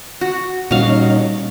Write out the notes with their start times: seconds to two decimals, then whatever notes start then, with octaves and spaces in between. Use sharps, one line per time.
0.21 F#4
0.71 A#2 G3 C#4 D#4 F#4 F5